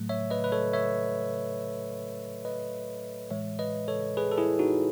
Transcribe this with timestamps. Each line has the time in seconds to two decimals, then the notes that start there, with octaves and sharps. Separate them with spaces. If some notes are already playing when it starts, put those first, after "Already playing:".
Already playing: A2 F#3 A3
0.09 C#5 E5
0.30 B4 D#5
0.44 B4
0.52 A4 C#5
0.73 C#5 E5
2.45 B4 D#5
3.31 A2 E3 G#3 C#5 E5
3.59 B4 D#5
3.88 A4 C#5
4.17 G#4 B4
4.31 A4
4.38 E4 G#4
4.59 D#4 F#4